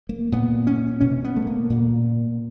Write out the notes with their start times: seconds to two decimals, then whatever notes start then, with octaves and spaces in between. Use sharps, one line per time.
0.09 A#3
0.32 A#2 B3
0.67 C#4
1.01 B2 C#4
1.24 B3
1.36 A3
1.47 A#3
1.70 A#2